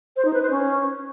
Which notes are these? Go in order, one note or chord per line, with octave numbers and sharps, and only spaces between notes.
C5
D#4
B4
C5
C#4